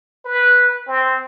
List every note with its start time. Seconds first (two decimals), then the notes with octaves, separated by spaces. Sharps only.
0.25 B4
0.88 C4